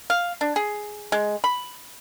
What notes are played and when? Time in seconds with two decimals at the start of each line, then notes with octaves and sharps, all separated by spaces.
0.10 F5
0.41 D4
0.56 G#4
1.12 G#3
1.44 B5